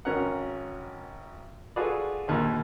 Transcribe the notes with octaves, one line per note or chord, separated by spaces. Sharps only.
G#1 C#4 A#4 F#5
F4 F#4 G#4 A4 B4 D5
A#1 D#2 A#2